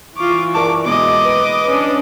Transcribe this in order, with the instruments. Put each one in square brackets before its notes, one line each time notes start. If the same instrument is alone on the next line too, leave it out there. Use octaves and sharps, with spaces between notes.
[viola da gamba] E3 [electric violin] F4 D6 [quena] C#6
[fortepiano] A#4 D5 A5 [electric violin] D6
[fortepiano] B2 G#3 A#3 [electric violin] D#5 D6
[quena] B4
[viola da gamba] C#4 D4